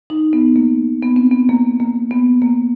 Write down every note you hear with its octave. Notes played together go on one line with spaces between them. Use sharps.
D#4
B3
A#3
B3
C4
B3
A#3
A#3
B3
A#3